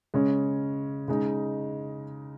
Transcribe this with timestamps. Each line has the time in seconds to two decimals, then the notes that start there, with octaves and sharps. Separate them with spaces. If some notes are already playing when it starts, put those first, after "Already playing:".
0.14 C#3 G#3 C#4
1.08 C#3 G#3 D#4